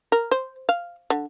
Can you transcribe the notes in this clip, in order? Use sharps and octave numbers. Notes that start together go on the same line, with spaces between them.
A#4
C5
F5
D3